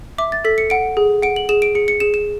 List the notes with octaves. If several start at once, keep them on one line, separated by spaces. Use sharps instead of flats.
E5 D6
A6
A4 B6
C#7
F#5 D7
G#4
F#5 D7
F#7
G#4 E7
D7
G#4 C#7
C#7
G#4 E7
E7